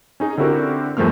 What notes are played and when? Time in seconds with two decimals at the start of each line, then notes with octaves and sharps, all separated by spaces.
0.20 C#4 D#4 G#4
0.38 D3 C4 E4 F#4 G4 A#4
0.97 E2 G2 F3 A3 A#3 F6